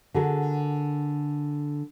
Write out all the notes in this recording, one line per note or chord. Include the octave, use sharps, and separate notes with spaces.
D3 F#4 G#4 A#4